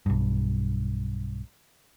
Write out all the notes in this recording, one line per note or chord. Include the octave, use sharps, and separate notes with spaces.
B1 G2